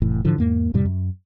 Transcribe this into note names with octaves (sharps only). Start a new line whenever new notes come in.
F1 A2 E3
G#2 D3 E3 F3
E2 G#2 A#3
F2 A2 C3 G3
F#2